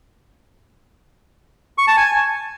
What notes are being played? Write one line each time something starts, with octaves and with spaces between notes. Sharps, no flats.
C#6
A5
G#5